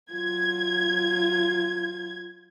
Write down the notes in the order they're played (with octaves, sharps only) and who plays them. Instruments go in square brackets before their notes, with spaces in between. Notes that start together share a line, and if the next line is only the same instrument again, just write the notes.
[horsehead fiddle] F#3 F4 [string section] G#6